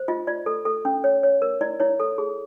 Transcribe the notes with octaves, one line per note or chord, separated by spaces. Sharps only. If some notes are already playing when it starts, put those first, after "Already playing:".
Already playing: C5
F4 D#5
F4 D5
A4
A4
C#4
C#5
C#5
A#4
E4 D5
E4 C#5
A4
G#4